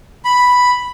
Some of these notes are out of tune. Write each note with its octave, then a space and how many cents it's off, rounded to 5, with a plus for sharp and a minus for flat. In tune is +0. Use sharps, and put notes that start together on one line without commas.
B5 +0